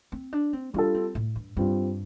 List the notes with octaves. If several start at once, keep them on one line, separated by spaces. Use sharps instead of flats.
C4
D4
C4
G3 D4 F4 A4
C4
A2
G2
G2 G3 C4 F4